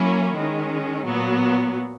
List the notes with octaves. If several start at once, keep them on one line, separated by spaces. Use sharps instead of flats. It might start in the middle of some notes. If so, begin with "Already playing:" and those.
Already playing: F#3 A#3 C#4 E4
D#3 G#3 C#4
A#2 F#3 B3